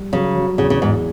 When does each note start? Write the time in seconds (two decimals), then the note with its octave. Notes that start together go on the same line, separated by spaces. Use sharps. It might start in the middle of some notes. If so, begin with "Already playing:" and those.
Already playing: G3
0.13 C#3 F#3
0.35 F#3
0.58 E2 C#3
0.70 C#3
0.81 E2 G#2